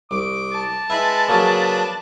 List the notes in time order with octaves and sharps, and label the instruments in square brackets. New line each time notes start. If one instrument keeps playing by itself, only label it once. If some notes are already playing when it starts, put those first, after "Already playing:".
[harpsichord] C2 [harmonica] D6
[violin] A5
[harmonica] G#3 B4 [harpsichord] E4
[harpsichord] C#3 F#3 A#3 [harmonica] D4 B4